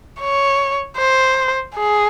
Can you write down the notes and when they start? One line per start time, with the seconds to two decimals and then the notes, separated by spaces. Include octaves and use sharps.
0.20 C#5
0.97 C5
1.75 G#4